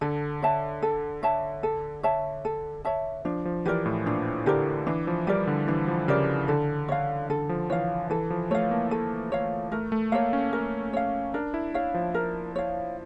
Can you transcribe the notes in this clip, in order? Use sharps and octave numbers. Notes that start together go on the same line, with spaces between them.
D3 A4
C#5 E5 A5
A4
C#5 E5 A5
A4
C#5 E5 A5
A4
C#5 E5 A5
F3 D4
F3
E3 G4 A#4 D5
A2
A#2 D4
D3 G4 A#4 D5
E3 D4
F3
G3 G4 A#4 D5
D3
E3 D4
F3
C#3 G4 A#4 D5
D3 A4
C#5 F5
D3 A4
F3
E3 C#5 F5
E3 A4
F3
A3 C#5 F5
A#3
A4
C#5 F5
A3 A#4
A3
A#3 C#5 F5
C#4
A#4
C#5 F5
D4 A#4
E4
C#5 F5
F3
A#4
C#5 F5